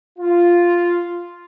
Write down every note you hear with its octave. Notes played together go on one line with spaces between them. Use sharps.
F4